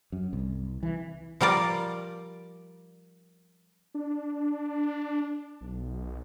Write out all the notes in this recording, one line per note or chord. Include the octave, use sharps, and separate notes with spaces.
F#2
C2
E3
F3 G3 A#4 D5
D4
B1